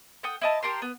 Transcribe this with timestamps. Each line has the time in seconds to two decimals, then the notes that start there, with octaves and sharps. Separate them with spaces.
0.23 A4 F#5 G5 D#6
0.42 E4 D#5 A5
0.63 G4 A4 A#4 C6
0.82 B3